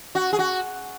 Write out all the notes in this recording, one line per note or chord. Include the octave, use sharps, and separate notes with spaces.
F#4
G#4
F#4